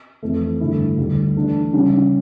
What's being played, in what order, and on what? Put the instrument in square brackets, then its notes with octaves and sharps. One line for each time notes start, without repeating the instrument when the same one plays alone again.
[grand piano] F2 E3 A3
G2 D3 A3 E4
D2 D3 G3
E3 A3 D4
C#3 G3 C#4